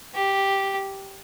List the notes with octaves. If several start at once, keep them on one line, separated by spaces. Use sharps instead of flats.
G4